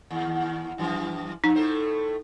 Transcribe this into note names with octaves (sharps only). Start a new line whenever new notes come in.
D#2
F#2 E3 F3
F3 D#4
A2 A3 C5